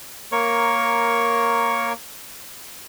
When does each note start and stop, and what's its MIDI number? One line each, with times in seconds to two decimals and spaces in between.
0.32 1.93 58
0.32 1.93 70
0.32 1.93 73
0.32 1.93 85